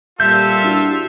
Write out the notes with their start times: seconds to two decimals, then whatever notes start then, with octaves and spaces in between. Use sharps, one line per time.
0.20 A#2 G3 F4 A4 E5 G6
0.64 D4 E4 F#4